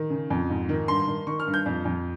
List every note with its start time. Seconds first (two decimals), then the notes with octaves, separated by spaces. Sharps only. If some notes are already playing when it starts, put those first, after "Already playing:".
Already playing: D#3
0.10 C#3
0.30 F2
0.50 G#2
0.69 D#3
0.88 G2 C6
1.07 D#3
1.27 D#3 C#6
1.40 F6
1.47 G2
1.54 G6
1.66 F2
1.85 F2